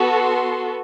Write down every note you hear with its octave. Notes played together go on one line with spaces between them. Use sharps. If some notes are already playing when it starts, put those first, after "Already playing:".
Already playing: B3 F#4 A4
C6